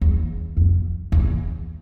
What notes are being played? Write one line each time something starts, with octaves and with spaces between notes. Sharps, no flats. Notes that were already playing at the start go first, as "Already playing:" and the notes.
E2
F2
E2